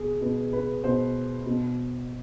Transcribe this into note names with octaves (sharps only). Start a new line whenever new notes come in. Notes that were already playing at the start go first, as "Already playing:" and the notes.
Already playing: B2 G#4
B2 B4
B4
B2 C5
B2